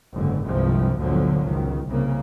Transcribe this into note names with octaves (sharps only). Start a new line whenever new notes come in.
F#1 G#2 D3
G1 C2 G2 C3 F3 G#3
G1 D2 A#2 D3 F3 F#3
C#2 D#3
C2 C#3 A#3